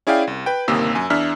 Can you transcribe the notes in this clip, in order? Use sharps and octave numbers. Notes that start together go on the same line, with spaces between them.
C#4 E4 G#4 D5 F5 G5
C2
B4 G5
G1 D#2 C3 A#3 D#6 E6
F#2 G#5
E2 D4 E5 F6